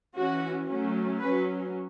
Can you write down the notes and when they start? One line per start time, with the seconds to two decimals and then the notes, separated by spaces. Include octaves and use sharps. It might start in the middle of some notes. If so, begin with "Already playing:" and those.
0.15 E3 C#4 F#4
0.67 F#3 A3 C#4
1.20 F#3 C#4 B4